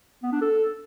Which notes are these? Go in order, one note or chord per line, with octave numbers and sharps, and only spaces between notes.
B3
D4
A4